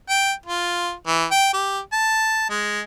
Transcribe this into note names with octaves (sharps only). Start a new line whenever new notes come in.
G5
F4
E3
G5
G4
A5
G#3